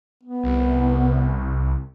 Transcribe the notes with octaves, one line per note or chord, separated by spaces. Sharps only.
B3
C2